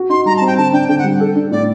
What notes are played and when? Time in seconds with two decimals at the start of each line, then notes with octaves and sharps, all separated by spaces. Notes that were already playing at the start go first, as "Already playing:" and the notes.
Already playing: F#4
0.09 D#4 C6
0.26 G3 A#5
0.37 A5
0.41 C4
0.47 G5
0.57 D3 A5
0.72 D4 G5
0.88 D3 G5
0.98 F#5
1.04 G3
1.20 A4
1.35 D4
1.51 A2 D5